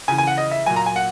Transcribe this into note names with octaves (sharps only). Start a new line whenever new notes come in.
C#3 E3 G#5
G#5
F#5
D#5
E5
A#2 F#3 G#5
A#5
G#5
F#5